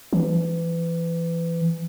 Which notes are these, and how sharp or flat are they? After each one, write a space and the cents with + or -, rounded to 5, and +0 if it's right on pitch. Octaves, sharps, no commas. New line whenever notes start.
E3 +25